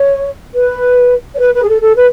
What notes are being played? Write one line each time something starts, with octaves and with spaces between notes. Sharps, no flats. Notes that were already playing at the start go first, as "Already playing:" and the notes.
Already playing: C#5
B4
C#5
B4
B4
G#4
A4
A4
B4